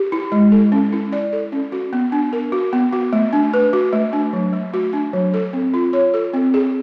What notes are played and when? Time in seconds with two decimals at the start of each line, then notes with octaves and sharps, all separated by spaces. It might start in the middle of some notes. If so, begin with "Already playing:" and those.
Already playing: G4
0.12 E4
0.32 G#3
0.52 A4
0.72 C#4
0.93 E4
1.13 D5
1.33 A4
1.52 C#4
1.72 F#4
1.93 B3
2.12 D4
2.33 A#4
2.52 F#4
2.73 B3
2.93 F#4
3.13 A3
3.33 D4
3.53 B4
3.73 F#4
3.93 A3
4.13 D4
4.33 F#3
4.53 A3
4.74 F#4
4.93 D4
5.13 F#3
5.34 A4
5.53 C4
5.74 F4
5.93 C#5
6.14 A4
6.33 C4
6.54 G#4